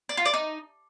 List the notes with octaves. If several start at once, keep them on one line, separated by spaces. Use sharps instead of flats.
D5
F4
D5
D#4